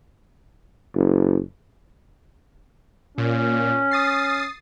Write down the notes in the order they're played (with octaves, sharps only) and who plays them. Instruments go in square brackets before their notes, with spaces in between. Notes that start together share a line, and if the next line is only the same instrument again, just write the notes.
[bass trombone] F#1
[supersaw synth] A#2 [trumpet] C#4
[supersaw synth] D#6 A6 C7